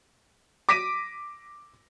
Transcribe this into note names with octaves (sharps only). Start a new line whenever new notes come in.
D6 A#6 B6 D7 D#7